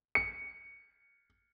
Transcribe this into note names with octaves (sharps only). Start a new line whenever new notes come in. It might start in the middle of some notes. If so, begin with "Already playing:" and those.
C#7